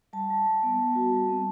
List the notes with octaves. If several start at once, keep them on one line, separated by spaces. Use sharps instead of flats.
G3 A5
G3
G3
B3
G3
F#4
G3
C4